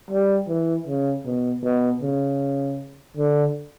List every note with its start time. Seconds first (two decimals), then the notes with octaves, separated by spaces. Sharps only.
0.11 G3
0.48 E3
0.87 C#3
1.25 B2
1.63 B2
2.02 C#3
3.17 D3